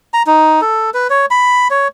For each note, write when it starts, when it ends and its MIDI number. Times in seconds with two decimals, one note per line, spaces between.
0.14 0.23 82
0.27 0.61 63
0.61 0.90 69
0.94 1.07 71
1.10 1.26 73
1.31 1.68 83
1.71 1.88 73